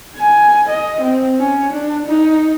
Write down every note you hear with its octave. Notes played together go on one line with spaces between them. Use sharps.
G#5
D#5
C4
C#4
D4
D#4